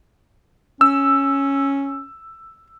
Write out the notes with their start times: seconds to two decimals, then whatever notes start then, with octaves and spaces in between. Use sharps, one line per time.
0.81 C#4 E6